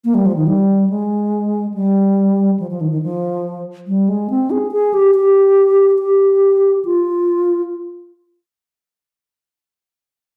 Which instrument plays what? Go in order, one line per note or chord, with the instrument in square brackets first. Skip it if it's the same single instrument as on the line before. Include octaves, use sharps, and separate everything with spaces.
[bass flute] A#3
G3
F3
D#3
G3
G#3
G3
F3
F3
D#3
D#3
F3
G3
G#3
C4
G#4
G#4
G4
G4
G4
F4